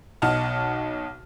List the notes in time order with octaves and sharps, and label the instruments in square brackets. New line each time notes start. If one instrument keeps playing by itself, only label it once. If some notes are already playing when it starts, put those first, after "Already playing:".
[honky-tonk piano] B1 D#5 F#5 A5 F6